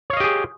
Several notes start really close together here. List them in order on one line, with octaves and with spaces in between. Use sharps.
C#5 F5 D#5 G4 G#4